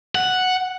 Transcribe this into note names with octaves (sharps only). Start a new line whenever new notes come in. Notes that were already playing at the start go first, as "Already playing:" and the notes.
F#5